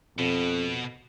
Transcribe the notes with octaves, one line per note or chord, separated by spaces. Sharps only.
F2 B2